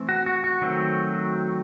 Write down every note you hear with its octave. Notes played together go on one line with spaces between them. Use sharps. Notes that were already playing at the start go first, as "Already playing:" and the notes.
Already playing: E3 A3 C4
F#4
F#4
F#4
D#3 F#3 A3 C4